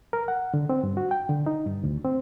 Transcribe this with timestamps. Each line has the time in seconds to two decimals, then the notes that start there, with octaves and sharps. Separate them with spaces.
0.13 A#4
0.28 F#5
0.54 D3
0.69 C4
0.83 G2
0.97 F#4
1.11 G5
1.29 D3
1.46 D#4
1.66 G2
1.84 D2
2.05 C4